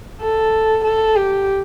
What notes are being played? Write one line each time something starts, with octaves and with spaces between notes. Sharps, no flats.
A4
A4
G4